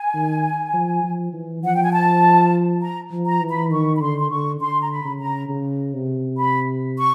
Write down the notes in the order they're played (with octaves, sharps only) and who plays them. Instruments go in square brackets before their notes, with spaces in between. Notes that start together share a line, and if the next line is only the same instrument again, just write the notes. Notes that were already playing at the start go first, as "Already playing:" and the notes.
Already playing: [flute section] G#5
[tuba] D#3
F3
F3
E3
[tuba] F3 [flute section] F#5
[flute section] G5
G#5
A5
A#5
[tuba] F3
[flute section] A#5
[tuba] E3
[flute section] B5
[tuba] D#3 [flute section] C#6
[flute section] B5
[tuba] D3 [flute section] C6
[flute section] C6
[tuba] D3 [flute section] C#6
[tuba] D3 [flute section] C6
[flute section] A#5
B5
[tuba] C#3
[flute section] A#5
[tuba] C#3
C3
[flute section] B5
C#6